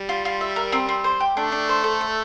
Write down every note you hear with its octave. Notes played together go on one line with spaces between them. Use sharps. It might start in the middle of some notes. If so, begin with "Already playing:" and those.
Already playing: G3
F4
F4
E5
A#4
C4
C4
C5
G4
A3 D4
D4
C5
A4
E5